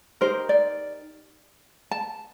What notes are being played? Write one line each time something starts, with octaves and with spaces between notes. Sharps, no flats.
D#4 G4 A#4 C5
D5
A5